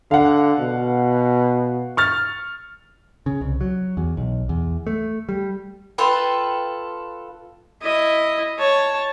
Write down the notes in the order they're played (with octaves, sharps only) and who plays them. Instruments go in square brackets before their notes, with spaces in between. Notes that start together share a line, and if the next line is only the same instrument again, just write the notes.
[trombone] D3 [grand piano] F5 F#5
[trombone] B2
[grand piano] C#6 F6 A6
[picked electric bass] C#3
C2
F#3
E2
B1
E2
A3
G3
[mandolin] F4 A4 B4 G5
[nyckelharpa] E4 D#5
C#5 A5